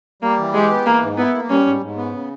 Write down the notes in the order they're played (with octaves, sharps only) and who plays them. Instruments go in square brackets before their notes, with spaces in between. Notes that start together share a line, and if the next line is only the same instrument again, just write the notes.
[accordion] G3 [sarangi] A#3
[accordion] E3
[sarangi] G#3 [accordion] G4
[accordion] B3
[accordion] E3 [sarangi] A#3
[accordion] G#2
[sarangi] B3 [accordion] E4
[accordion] A#3
[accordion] G3 [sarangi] C#4
[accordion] G#2
G#2
B3
C#3